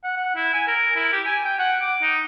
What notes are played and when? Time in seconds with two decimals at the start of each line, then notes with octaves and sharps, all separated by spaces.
0.04 F#5
0.17 F#5
0.35 E4
0.54 G#5
0.68 A#4
0.96 E4
1.13 G4
1.26 G#5
1.44 G5
1.59 F#5
1.82 D6
2.02 D#4